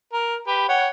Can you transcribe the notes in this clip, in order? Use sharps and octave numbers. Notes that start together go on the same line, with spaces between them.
A#4
G4 B4
C#5 F#5 G5